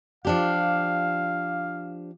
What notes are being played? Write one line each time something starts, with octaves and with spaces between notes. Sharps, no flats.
F3 D4 G4 F5